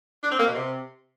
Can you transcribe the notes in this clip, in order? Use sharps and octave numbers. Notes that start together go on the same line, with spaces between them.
D4
C4
A#3
B2
C3